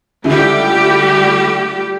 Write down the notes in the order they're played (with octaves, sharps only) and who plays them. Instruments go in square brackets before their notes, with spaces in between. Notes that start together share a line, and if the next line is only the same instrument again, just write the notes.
[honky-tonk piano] C#2 D3 E4 [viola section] G3 A3 G4